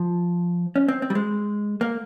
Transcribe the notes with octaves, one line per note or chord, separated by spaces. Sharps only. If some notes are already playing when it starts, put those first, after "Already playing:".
Already playing: F3
C#4
C4
C4
G3
G#3
A#3